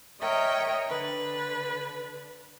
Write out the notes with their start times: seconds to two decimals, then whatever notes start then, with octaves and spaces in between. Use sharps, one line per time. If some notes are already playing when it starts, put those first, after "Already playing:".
0.21 A#4 C#5 D#5 E5 G5
0.86 D3 B4